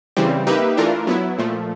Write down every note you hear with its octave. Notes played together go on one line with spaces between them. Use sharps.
C#3 E3 G3 C4
A#3 D#4 G4 B4 E5
E3 A3 D4 F4 A#4
F#3 B3 E4
A#2 F3 A3